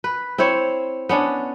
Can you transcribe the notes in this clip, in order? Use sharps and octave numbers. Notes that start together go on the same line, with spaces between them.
B4
C4 E4 C5 C#5
B3 C#4 D4